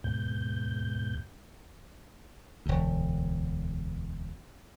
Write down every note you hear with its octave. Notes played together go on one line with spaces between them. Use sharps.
D#2 G#2 B2 G6
E1 D2